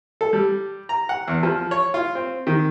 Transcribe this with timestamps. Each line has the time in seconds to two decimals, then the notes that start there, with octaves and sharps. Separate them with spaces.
0.21 A4
0.33 G3
0.89 A#5
1.09 F#5
1.28 E2
1.43 F3
1.71 C#5
1.94 F4
2.15 C4
2.47 D#3